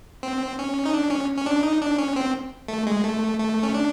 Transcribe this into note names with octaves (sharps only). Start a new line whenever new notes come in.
C4
C#4
D#4
D4
C#4
C#4
D4
D#4
D4
C#4
C4
A3
G#3
A3
A3
C#4
D4